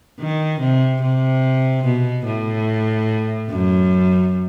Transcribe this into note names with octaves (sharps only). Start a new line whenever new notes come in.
D#3
C3
C3
B2
A2
F#2